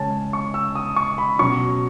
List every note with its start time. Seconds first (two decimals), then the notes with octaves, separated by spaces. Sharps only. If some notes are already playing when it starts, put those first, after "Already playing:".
Already playing: C#3 G#3 C#4 G#5 A5
0.33 C#6
0.54 E6
0.75 D#6
0.96 C#6
1.18 B5
1.39 B2 F#3 C#4 C#6